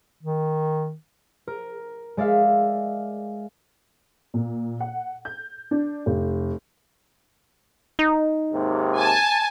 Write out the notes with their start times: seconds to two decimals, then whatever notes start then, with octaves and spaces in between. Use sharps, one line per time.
0.23 D#3
1.47 A#4
2.17 G#3 D5 E5 F5
4.34 A#2
4.80 F#5
5.25 G6
5.71 D4
6.06 F1
7.99 D#4
8.54 D#2 G#2 C3
8.98 G#5 A5